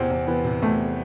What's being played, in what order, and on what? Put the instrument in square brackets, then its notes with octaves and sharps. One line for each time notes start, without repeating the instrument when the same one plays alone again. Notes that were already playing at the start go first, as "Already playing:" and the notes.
Already playing: [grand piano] E2 C3 E3 [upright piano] C4
[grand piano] E2
[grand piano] E3 [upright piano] B3
[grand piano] C3
[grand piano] E2 [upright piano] A3